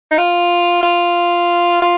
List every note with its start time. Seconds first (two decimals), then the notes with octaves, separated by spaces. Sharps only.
0.11 D#4
0.18 F4
0.83 F4
1.82 F4